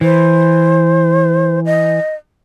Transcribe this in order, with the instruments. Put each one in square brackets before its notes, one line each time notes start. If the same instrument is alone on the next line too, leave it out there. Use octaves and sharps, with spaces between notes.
[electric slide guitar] E3 [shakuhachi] C5
[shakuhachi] D#5